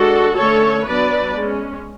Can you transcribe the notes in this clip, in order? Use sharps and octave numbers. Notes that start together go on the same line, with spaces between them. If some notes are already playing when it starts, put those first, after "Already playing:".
Already playing: G#3 D4 F#4 A4
D3 A3 C#4 A4 C#5
F#3 B3 D4 B4 D5
G#3 C#4